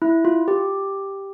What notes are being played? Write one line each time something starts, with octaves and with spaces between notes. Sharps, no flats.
E4
F4
G4